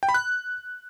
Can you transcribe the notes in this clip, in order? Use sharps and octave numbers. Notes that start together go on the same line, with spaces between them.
G5
B5
F#6